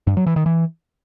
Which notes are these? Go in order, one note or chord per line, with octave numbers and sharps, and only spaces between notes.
G2
F#3
E3
D#3
E3